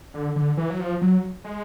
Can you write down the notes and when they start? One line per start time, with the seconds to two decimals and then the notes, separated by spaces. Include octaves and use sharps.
0.14 D3
0.36 D3
0.57 E3
0.70 F#3
0.79 F3
1.02 F#3
1.44 G#3